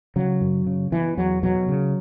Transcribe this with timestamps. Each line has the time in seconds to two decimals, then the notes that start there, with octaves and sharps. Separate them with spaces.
0.16 C#3 F#3
0.41 F#2
0.67 C#3
0.92 B2 E3
1.17 E2 F#3
1.43 B2 F#3
1.69 C#3